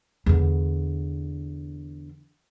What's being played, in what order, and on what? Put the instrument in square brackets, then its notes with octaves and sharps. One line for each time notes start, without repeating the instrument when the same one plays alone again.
[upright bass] E2 D3